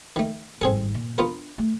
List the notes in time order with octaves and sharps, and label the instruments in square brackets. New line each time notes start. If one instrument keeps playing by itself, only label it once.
[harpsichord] D#3 A3
[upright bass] G#1 G2 [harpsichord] C4 G#4 A4
[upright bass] A#2
[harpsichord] B3 F4 A#4 [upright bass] D4
[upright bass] A3